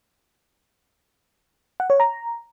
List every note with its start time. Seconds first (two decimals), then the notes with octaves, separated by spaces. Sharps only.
1.80 F#5
1.90 C#5
2.00 A#5